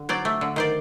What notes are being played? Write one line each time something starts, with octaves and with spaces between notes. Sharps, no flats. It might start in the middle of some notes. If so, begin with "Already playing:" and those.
Already playing: D3
F#3 C5 D5
A3
D3
D#3 C5 D5